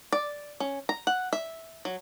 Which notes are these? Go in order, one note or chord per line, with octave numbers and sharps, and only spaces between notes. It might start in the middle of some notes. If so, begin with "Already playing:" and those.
D5
C#4
A#5
F#5
E5
F#3